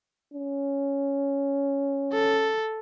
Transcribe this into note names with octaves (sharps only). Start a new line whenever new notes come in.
C#4
A4